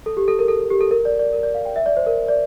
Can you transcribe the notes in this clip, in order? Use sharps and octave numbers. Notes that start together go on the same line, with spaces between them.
A4
G4
A4
A#4
A4
A4
G4
A4
A#4
D5
D5
A#4
D5
F5
G5
E5
D5
C5
A#4
D5